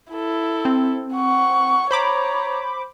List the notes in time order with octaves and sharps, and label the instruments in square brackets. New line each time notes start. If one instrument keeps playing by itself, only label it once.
[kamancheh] E4 A4
[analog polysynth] C4
[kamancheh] F#5 C#6
[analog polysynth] C5 B5 D6 [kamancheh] C#5 A#5